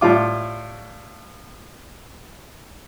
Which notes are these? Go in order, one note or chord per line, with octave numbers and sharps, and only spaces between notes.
A2 G3 F4 D6